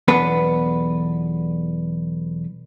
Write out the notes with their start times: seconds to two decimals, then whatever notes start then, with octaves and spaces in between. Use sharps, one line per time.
0.08 B1 E2 B3 D4 B4